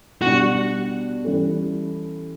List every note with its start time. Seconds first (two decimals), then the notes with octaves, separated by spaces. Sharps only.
0.22 B2 G3 D4 F#4
1.24 E3 G3 C#4 E4 A4